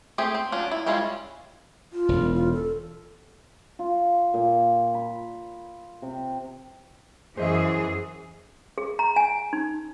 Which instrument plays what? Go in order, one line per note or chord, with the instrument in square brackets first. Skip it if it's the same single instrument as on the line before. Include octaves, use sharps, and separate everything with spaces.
[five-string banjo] A3 C4 G4 G#4
C4
F#3 C#4 D4 F4
E4
G3 G#3 C#4 E4 F4
[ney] F4
[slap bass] E1
[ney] F4
A4
[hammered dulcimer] F4
A#2
B5
C3
[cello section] F#2 E3 G#4 [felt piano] C5 D#5 E5
[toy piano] G#4
A#5
G#5
D#4